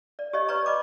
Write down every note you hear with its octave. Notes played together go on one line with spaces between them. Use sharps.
D5
G4 C#5 D#5
B4 C#5 D5 A#5 C#6
D5 D#5 B5 D6